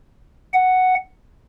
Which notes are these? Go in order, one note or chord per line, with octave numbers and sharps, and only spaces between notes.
F#5